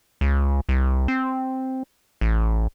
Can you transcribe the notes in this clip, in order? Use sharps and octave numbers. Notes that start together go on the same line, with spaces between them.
C#2
C2
C4
A1